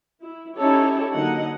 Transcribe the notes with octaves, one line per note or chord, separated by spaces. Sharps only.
E4
C#4 D#4 E4 G4 A4 C#5
D3 F#3 A#3 D#4 D#5 F#5